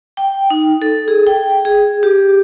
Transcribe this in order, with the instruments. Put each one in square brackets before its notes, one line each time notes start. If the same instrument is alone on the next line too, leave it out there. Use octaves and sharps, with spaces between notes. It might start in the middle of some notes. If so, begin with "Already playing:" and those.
[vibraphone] G5
D#4
A4
G#4
G5
G#4
G4